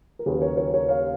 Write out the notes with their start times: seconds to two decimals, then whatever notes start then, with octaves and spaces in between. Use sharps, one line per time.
0.19 A#4
0.26 D#2 C#3 F#3 A#3 C#4 G#4 B4
0.42 A#4 C#5
0.57 A#4 C#5
0.74 A#4 C#5
0.88 C#5 F5